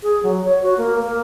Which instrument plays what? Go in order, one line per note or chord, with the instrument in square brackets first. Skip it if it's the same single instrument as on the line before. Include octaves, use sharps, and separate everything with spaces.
[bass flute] G#4
F#3
C#5
F#4
A#3
A#3